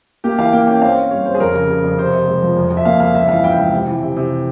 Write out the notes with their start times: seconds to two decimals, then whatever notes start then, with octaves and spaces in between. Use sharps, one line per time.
0.24 A#3 G4
0.39 E3 F5
0.53 A#3 G5
0.67 C#4 G5
0.82 C4 F5
0.97 C4
1.11 G3 C#5
1.26 G3 C5
1.34 G#4
1.40 F2 A#4
1.55 C#3
1.70 C#3
1.84 F2
1.98 C3 C5
2.13 C3
2.28 G#3
2.42 F3
2.57 F2
2.71 F2
2.77 E5
2.85 A#3 F5
3.00 F2 F5
3.15 C#2 E5
3.29 E3 F5
3.44 C#2 G5
3.58 C#2
3.73 C3
3.87 E3
4.02 C3
4.16 C3